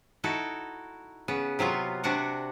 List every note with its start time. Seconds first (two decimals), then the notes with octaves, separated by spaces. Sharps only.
0.24 D#4 E4 F#4 A4
1.28 C#3 B3
1.59 C3 F#3 B3 F4
2.04 C3 D4 F#4 F#5